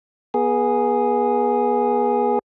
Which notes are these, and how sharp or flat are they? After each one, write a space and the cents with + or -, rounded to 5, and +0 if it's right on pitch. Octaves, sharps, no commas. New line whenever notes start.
B3 -30 G#4 +0